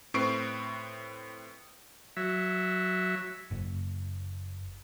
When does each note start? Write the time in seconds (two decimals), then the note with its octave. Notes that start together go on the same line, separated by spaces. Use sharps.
0.14 A2 C4 B4 C#6 C7 D7
2.17 F#3 E5
3.51 F#1